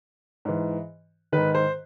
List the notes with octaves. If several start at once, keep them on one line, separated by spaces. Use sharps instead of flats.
G#2 E3
G#2 D#3 B4
C5